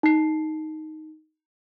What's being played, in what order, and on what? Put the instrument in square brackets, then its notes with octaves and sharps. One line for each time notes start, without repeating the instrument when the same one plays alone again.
[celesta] D#4 C7